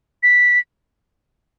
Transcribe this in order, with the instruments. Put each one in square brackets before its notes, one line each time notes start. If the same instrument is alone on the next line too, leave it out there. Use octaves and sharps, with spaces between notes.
[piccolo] B6